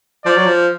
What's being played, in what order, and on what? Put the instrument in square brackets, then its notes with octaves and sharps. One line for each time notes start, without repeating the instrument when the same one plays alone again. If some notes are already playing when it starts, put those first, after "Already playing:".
[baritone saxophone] F3 [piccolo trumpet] D5
[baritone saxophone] F#3
F3